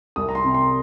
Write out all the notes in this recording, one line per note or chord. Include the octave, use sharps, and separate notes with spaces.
C2 D#6
A#5
C6
C3
C6